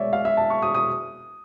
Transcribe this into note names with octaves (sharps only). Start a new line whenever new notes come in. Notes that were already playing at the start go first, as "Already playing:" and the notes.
Already playing: B2 G#3 C#5 D5 E5
F5
E5
A5
C#6
D#6
D#6